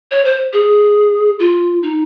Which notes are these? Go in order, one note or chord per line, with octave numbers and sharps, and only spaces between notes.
C#5
C5
G#4
F4
D#4